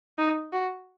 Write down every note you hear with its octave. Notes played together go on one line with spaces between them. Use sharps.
D#4
F#4